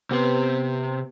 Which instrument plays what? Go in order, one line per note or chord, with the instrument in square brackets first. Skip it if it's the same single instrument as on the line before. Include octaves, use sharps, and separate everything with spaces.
[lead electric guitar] C3 C6 [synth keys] B3 G4 B4